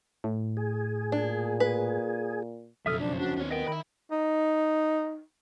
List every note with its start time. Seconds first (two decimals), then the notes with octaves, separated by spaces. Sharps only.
0.24 A2
0.57 G#4
1.12 A#2 D4
1.60 B4
2.86 F#1 B1 F2 A4 E5 D#6 F6
3.00 C#4 D4 C5
3.20 D4 F#4
3.37 D#2 C4 D4 C#5
3.51 A#4 B4 D#5 F#5 G5
3.68 D#3 E5 B5
4.11 D#4